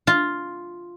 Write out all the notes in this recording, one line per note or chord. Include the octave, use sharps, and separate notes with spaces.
F4